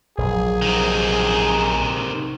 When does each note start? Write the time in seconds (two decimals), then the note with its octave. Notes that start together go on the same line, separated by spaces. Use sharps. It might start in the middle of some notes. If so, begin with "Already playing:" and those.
0.18 A#1 F#3 G#4
0.62 C3 D#3